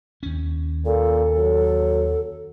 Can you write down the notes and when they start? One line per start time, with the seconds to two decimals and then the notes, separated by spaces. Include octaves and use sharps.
0.23 D#2 C#4
0.85 A#2 A4
1.37 F#3